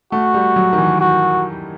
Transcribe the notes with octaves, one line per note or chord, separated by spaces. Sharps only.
A3 F#4
G3
F#3
D#3
E3
F#4